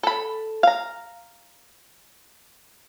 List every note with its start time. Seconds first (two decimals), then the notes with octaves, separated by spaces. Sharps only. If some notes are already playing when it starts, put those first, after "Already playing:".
0.03 A4 B5
0.63 F5 A#5